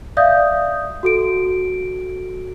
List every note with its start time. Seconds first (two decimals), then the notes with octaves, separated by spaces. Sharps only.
0.17 D5 E5 F5 D#6 G6
1.03 F#4 A4 D7